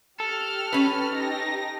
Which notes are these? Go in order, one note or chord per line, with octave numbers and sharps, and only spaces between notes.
G4 A4 F6
C#4 B4
D#4 G4 A#6